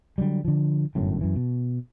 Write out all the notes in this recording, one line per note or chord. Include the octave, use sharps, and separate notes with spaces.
D3 F#3 G3
D3 F3
G1 F#2 A2
F#2 E3
B2